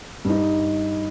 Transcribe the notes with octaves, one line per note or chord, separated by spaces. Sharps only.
G2 D#4